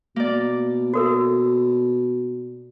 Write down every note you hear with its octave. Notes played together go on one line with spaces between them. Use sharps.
B2 A#3 D5
F#4 A4 A#4